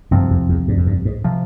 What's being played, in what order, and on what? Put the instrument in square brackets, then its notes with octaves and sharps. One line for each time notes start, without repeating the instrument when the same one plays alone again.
[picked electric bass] C2 C3 F3 C4 [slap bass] G2
[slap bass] F2
E2
G2
F2
G2
G#2
[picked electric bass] C3 F3